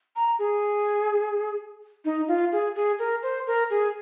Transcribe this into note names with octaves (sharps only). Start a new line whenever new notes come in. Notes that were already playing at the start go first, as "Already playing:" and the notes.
A#5
G#4
D#4
F4
G#4
G#4
A#4
C5
A#4
G#4